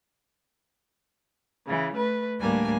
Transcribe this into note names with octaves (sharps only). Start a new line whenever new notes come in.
C#3 E3
A3 B4
D2 A2 G3 A#3 D4 G#5